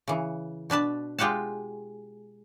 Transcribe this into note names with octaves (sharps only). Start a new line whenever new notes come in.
C#3 E3
B2 D4 B4 A5
G#3 F4 G4 F#5 A5